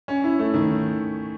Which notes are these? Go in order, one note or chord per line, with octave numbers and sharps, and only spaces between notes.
C#4
E4
A3
D#3